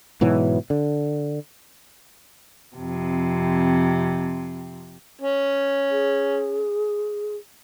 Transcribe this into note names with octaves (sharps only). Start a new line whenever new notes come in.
G#2 B2 E3 F#3
D3
F2 C3
C#4
G#4